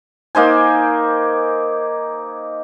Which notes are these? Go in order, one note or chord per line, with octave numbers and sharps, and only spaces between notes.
A#3 D#4 C5 G#5